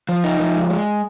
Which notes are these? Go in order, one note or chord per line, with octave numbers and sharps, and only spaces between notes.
F3
D#4
F3
G#3
G#3